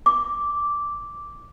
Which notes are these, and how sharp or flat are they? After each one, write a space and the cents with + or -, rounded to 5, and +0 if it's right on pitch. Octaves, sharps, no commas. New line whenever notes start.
D6 -5